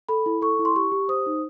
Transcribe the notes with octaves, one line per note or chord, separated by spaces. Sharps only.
A4 B5
E4
A4 C#6
E4
C6
G4 C#6
G4
C5 D#6
D#4